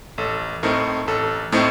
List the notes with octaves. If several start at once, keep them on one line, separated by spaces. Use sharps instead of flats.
A1 A4
A2 A3 C4 D#4 A#4
A1 A4
A2 A3 C4 D#4